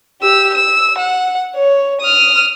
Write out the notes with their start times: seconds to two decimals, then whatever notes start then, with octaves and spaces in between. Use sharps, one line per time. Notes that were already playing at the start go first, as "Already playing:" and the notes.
0.22 G4 E6
0.54 E6
0.98 F#5
1.56 C#5
2.01 D#6 F6